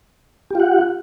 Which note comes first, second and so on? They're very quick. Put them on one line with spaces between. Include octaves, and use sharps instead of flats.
G4 F4 F#5